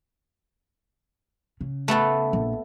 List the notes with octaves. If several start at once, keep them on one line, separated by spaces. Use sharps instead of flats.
C#3
A3 B3 A4
A#1